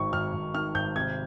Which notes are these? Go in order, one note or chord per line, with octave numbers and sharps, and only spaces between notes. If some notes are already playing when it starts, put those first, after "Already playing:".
Already playing: G#1 D#3 C#6
G#1 F6
G#1
D#3 F6
G#1 G6
C3 G#6